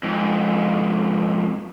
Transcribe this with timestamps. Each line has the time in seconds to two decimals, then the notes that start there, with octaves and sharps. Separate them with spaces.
0.03 F2 G#2